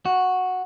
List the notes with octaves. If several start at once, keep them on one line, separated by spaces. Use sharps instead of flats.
F#4